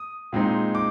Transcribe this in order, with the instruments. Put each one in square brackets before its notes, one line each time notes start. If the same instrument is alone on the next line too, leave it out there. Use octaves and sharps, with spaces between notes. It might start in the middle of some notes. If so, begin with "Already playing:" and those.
Already playing: [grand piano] D#6
A#2 G#3 C4 D#4
D6